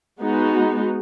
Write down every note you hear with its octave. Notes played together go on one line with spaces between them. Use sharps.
G#3 B3 D#4 F#4